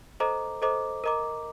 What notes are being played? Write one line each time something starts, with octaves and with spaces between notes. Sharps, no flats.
A4 C5 D#5 A#5 D6
A4 C5 D#5 A#5 D6
A#4 D#5 A#5 D6